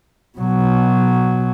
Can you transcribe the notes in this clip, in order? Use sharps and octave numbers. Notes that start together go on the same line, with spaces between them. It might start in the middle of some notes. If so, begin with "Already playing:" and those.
B2 F#3